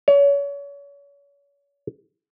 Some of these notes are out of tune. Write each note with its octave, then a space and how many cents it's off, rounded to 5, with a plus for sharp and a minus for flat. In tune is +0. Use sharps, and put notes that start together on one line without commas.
C#5 +35